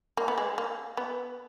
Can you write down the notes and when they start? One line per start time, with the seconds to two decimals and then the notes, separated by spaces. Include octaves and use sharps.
0.17 A#3
0.28 B3
0.38 G#3
0.58 A#3
0.97 B3